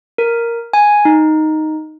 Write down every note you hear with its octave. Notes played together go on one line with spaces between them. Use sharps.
A#4
G#5
D#4